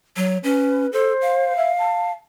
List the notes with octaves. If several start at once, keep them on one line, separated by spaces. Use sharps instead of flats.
F#3
C#4 B4
A4 C5
F5
E5
A5